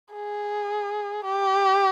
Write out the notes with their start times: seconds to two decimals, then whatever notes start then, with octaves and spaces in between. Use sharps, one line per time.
0.13 G#4
1.25 G4